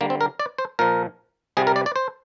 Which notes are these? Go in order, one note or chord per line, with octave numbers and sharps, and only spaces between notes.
D3 G3 A#3
C4
A#4
D5
C5
A#2 F3 A#4
C3 G3 G#4
A#4
D5
D5
C5